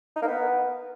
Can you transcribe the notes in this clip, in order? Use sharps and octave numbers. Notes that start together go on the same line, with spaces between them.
D#4
A#3
B3